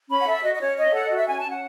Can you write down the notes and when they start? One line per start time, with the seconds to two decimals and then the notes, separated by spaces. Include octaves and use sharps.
0.09 C#4 B5
0.20 F#5
0.26 A4 E5
0.43 F#4 D#5
0.55 D#5
0.61 C#4 C#5
0.77 C#5 D#5
0.88 E5
0.94 A4 F#5
1.06 D#5
1.11 F#4
1.16 E5
1.28 C#4 G#5
1.39 A5
1.45 C#4
1.50 F#5